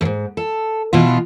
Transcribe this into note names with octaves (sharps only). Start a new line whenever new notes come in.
F2 G#2
A4
B2 E3 F4